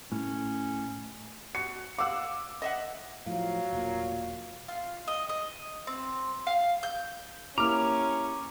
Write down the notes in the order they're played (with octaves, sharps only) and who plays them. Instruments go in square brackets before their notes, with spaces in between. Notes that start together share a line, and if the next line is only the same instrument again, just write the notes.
[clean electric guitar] A2 [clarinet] C#4
[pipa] F#4 [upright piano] C#7
[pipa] F5 F#5 [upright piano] D6 E6
[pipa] D#5 E5 F#5
[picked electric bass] A2 [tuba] F3 [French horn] F#3 [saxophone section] F5
[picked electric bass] E1 [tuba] A#2
[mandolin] F4
D#5
D#5
C4
F5
G6
[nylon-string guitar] A#3 E4 G4 [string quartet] C#4 [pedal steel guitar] A#5 F6 [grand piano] D6